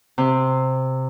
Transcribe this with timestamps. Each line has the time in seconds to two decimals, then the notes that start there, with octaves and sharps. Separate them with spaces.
0.18 C3